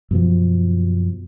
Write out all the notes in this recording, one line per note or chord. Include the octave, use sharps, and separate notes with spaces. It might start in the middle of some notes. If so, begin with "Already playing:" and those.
F#2 B2 F3